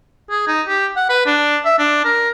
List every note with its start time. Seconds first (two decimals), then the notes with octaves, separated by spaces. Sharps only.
0.30 G#4
0.47 D#4
0.68 G4
0.96 F#5
1.09 B4
1.26 D4
1.65 E5
1.79 D4
2.05 A#4